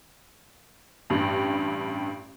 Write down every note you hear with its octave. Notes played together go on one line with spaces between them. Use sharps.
A1 G2